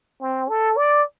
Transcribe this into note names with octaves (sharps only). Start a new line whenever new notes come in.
C4
A4
D5